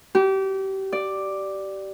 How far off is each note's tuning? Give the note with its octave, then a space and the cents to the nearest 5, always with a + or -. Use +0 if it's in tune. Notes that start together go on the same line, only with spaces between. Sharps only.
G4 -30
D5 +5